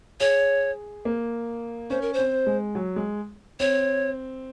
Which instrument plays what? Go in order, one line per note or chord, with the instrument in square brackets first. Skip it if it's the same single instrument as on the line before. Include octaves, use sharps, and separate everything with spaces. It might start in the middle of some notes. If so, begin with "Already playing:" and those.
[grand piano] G#4 [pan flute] C#5
[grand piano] A#3
[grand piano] C#4 [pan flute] C5
[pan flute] A#4
C5
[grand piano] C4
G#3
F#3
G#3
[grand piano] C4 [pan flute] C#5